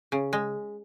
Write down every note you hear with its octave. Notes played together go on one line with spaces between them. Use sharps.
C#3
G#3